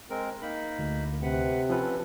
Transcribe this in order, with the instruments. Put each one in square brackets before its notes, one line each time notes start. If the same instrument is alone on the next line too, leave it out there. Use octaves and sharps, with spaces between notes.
[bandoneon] G#3 C4 A#4
A#3 D#4 B5
[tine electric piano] D2
[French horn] C3 [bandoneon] B4 F#5
[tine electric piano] F3 C#4 B4 [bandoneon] C4 A4